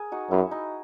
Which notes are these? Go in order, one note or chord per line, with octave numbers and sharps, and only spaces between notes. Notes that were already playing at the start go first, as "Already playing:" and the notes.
Already playing: G#4 A#4
D#4 F#4
F#2 E4
D#4